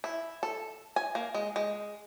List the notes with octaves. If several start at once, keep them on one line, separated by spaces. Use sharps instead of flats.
E4
A4
G#5
A#3
G#3
G#3